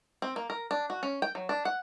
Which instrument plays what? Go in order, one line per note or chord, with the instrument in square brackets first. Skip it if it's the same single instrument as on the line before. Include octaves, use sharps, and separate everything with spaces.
[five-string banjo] C4
A#3
A#4
D4
F#4
C#4
G5
F#3
D4
F#5